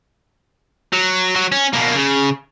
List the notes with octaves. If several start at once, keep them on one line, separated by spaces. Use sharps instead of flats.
F#3
F#3
C#4
B2 A#3
C#3